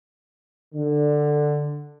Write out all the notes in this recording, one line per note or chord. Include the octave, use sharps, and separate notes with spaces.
D3